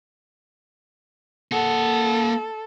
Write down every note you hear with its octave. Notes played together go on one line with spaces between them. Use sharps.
A#3 A4 F#5